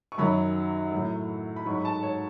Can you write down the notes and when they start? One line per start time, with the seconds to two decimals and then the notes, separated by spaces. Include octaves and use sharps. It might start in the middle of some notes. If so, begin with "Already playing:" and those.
0.12 C#6
0.18 F#2 D#3 F#3 B5
0.92 A2 F#3
1.56 B5
1.66 G#2 F#3 C#6
1.75 B5
1.85 A5
2.03 C#5